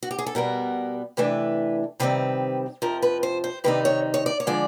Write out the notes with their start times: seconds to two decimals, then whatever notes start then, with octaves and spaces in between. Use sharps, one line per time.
0.03 F#4
0.11 G4
0.19 G#4
0.26 A4
0.35 B2 G3 B3 A#4
1.17 C3 E3 A3 D4 B4
2.00 C3 D#3 G3 C4 B4
2.82 F2 C3 F3 A#4
3.02 B4
3.23 C5
3.44 C5
3.64 C3 D#3 G3 C4 D#4 B4
3.85 C#5
4.14 C#5
4.26 D5
4.40 C#5
4.47 D3 F3 G#3 D5